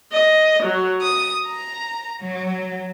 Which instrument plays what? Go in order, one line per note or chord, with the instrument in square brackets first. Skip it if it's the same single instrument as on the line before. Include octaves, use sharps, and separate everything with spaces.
[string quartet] D#5
F#3
D#6
A#5
F#3